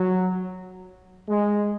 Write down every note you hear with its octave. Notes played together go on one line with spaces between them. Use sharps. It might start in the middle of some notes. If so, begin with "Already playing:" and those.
Already playing: F#3
G#3